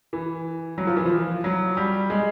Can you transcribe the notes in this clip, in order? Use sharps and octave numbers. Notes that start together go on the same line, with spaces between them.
E3
F#3
F3
E3
F3
F#3
G3
G#3